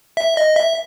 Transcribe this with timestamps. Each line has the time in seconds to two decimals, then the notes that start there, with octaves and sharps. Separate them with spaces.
0.17 E5
0.37 D#5
0.56 E5